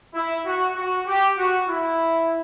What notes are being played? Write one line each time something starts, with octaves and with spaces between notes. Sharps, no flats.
E4
F#4
F#4
G4
F#4
E4